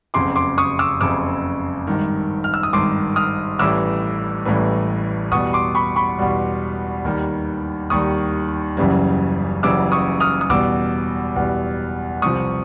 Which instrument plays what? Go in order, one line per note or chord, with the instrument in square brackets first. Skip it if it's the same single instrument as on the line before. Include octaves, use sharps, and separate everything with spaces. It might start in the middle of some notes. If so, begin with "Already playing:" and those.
[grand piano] F#1 F2 C#3 C6 D6
C6 D6
C#6 D#6
D6 E6
F#1 F2 C#3 D6 E6
G#1 G2 D#3
F6
E6
D#6
G#1 G2 D#3 C6 D6
D#6 F6
A1 A2 E3 G3 D6 E6
A1 A2 E3 G3
E2 B2 G3 C#6 D#6
C6 D6
B5 C#6
B5 C#6
E2 B2 G3
D#2 D#3 G3
D#2 D#3 G3 C#6 D#6
F#1 F#2 C#3 E3 G3
F#1 F#2 C#3 E3 G3 D6 E6
C#6 D#6
D#6 F6
D#6
E2 B2 G3 D6 E6
E2 B2 G3
C2 C3 F3 C#6 D#6